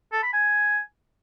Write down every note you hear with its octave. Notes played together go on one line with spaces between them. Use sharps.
A4
B5
G#5